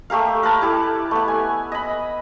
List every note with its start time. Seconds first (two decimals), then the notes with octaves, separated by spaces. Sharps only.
0.10 A3 G4 A#4 F5
0.43 A#4 B4 A5
0.62 E4 G4 A4
1.11 A3 B3
1.28 G#5
1.72 D#5 B5